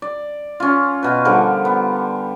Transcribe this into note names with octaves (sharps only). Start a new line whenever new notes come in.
D5
C#4 F4
B2 B4
D3 F3 G3 A#4
B3